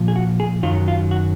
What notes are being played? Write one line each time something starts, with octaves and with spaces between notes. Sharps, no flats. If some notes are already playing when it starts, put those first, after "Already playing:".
Already playing: A#2 F3
G#4
F#4
G#4
F#2 D#3 F#3 F4
F4
F#4